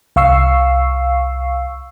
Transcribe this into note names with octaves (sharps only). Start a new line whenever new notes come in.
C2 F5 C#6 E6 C7